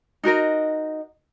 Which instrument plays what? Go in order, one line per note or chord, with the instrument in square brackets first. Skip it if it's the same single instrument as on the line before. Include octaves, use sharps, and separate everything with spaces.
[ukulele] D#4 F#4 A#4 D#5